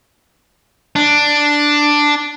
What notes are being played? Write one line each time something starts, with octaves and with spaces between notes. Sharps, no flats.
D4